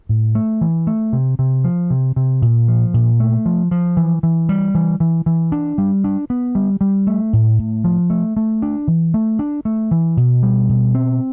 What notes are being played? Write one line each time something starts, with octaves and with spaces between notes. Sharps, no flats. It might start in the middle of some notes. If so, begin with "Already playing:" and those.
A2
A3
E3
A3
C3
C3
F3
C3
C3
A#2
F3
A#2
A3
F3
F3
E3
E3
G3
E3
E3
E3
D4
G3
D4
B3
G3
G3
A3
A2
A2
F3
A3
A3
D4
E3
A3
D4
A3
E3
B2
G3
B2
C4